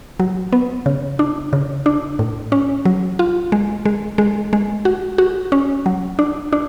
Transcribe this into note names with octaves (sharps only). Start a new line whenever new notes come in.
F#3
B3
C#3
D4
C#3
D4
A2
C#4
F#3
F4
G#3
G#3
G#3
G#3
F#4
F#4
C#4
F#3
D4
D4